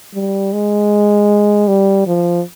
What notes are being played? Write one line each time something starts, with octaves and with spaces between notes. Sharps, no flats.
G3
G#3
G3
F3